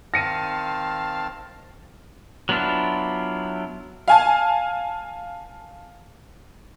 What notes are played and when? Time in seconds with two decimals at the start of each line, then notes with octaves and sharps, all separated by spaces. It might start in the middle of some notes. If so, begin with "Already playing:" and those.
0.14 D#3 C4 F5 A5 A#6 C#7 D#7
2.49 F#3 B3 D4 E4 F4
4.08 F5 G#5 A5